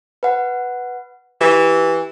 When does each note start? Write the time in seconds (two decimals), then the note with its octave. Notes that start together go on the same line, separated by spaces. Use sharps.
0.23 B4 F#5
1.41 E3 G4